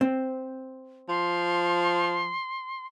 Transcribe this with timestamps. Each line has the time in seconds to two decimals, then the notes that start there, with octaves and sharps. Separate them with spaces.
0.01 C4
1.09 F3 C6